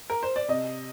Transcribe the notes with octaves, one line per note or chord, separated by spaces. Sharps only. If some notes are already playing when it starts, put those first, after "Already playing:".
A#4
C5
D5
C3 D#5